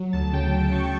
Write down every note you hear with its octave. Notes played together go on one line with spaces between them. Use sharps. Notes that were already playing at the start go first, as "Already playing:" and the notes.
Already playing: F#3
D2 A5
C#3 G5
D2 A5
F#3 C#6